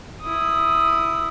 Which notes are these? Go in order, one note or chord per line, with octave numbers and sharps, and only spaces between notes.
E4 D#6